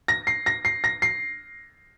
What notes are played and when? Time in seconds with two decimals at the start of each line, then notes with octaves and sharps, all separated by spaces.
0.08 A#6
0.27 C7
0.46 A#6
0.65 C7
0.84 A#6
1.02 C7